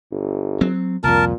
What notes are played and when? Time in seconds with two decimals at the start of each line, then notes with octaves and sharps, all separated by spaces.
0.11 G1
0.61 F#3 C4
1.04 C2 F2 A#2 A#4 A5